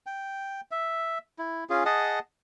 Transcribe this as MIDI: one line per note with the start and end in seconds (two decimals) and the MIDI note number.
0.06 0.61 79
0.71 1.18 76
1.39 1.64 64
1.70 1.84 61
1.70 1.84 65
1.70 1.84 68
1.86 2.19 68
1.86 2.19 75
1.86 2.19 78
1.86 2.19 81